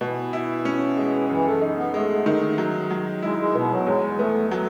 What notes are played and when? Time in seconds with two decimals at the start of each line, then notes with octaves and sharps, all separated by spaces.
0.01 B2 E3
0.33 E4
0.65 C#4
0.97 G#3
1.29 F#2 E3
1.45 A3
1.62 D#4
1.78 B3
1.94 G#3 A3
2.26 D#3
2.58 F#3
2.91 F#3
3.22 G#3 E4
3.39 G#3
3.55 B2 B3
3.71 F#3
3.86 E2 G#3
4.18 A3 B3
4.51 F#3 A3